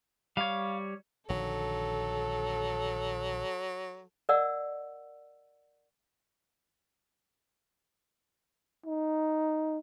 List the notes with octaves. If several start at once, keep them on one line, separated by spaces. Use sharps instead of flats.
G3 C#5 F5
A#1 D3 D#3 F#3 A4
A#4 D5 D#5 F#5 E6
D#4